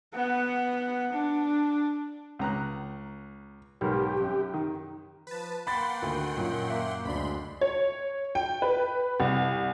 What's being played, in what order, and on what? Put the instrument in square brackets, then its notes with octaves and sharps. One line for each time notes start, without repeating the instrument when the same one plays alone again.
[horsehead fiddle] B3 F#5
D4
[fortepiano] C#2 A#5 F#6
[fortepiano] B1 G#2 A#4 [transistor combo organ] G4
[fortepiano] F#2
D#3
[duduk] F3 [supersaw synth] B4 A5
[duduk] A#3 [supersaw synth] F#5 G5 C6 [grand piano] B5 A6
[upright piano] D2 [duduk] D#3
[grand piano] F#2 [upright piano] A#2
[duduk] A#3 [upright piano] E5
[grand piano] D2 D4 [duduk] G#3 [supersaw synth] B5 C6
[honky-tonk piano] C#5
G5
B4
C2